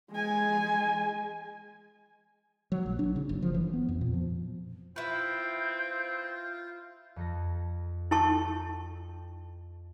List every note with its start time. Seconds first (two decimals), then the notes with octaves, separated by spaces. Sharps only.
0.11 G#3 G#5
2.72 F#3
2.86 A#1
2.99 D4
3.16 C#3
3.29 F#1
3.42 F3
3.54 E3
3.73 B3
3.89 F2
4.01 A#2
4.13 F3
4.96 C4 E4 F4 B4 G6
7.16 F2 A4 A#6
8.11 E4 A4 G5 A5 C#6